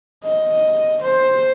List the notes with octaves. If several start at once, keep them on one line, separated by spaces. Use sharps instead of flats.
D#5
C5